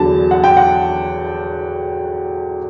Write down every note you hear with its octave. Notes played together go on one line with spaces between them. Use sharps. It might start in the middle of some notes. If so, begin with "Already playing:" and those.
Already playing: E2 D3 F#3 A5
F#5
G5
F#5